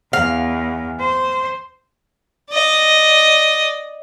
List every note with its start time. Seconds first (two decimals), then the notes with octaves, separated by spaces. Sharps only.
0.13 E2 F5
1.00 C5
2.51 D5 D#5